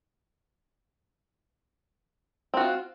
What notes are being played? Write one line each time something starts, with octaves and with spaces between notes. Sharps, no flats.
C4 F4 F#4